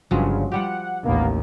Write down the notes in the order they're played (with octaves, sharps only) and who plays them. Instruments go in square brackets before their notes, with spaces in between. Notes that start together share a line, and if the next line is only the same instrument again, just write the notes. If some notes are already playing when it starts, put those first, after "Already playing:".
[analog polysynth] G1 G2 C#3 [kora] F3 F#3 G#3
[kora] F3 G3 G4 [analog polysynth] F#5
[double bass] A1 D#2 [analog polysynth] A#3 B3